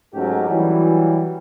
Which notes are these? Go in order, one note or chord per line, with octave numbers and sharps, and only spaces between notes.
G#2 F#3 A3 C#4 G4 A4
E3 F#3 G3